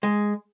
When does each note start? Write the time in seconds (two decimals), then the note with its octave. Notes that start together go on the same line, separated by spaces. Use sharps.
0.03 G#3